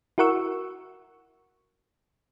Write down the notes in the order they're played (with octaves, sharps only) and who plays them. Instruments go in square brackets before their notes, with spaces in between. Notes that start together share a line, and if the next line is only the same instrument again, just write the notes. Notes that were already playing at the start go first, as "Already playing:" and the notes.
[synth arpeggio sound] E4 F#4 A#4 F#5 C#6 E6